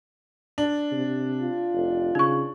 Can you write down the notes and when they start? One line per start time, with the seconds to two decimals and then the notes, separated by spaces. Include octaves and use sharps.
0.58 D4
0.92 C3
1.41 F4
1.73 F1
2.15 C#3 D#4 C#6